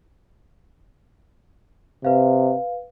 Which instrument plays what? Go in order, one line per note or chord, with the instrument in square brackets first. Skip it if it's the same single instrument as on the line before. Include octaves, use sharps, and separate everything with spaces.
[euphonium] C3 [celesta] B4 F5